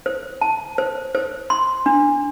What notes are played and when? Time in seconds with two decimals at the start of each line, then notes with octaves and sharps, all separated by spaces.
0.06 C5
0.41 A5
0.78 C5
1.15 C5
1.50 C6
1.86 D4